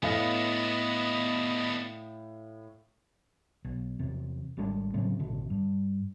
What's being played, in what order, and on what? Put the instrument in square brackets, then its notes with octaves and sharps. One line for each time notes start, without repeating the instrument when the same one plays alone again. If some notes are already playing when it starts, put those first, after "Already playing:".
[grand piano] A2 F5 A#6 [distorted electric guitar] B3 D4 [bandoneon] D#5 B5
[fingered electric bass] B1
E2 C3
G#1 G3 G#3 D4
A2 C#3 F#3 C4
A1 B2 D3
G2